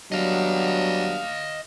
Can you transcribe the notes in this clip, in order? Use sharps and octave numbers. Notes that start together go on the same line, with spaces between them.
F#3 G3 B3 D4 D#5 F5